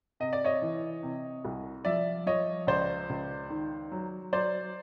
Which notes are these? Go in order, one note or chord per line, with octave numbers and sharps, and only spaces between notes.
C3 D#5
D5
C#5 D#5
E3
C3
C2
F3 D5 E5
F3 C#5 D#5
C#2 C5 D5
C#2
D#3
F#3
F#3 C5 D5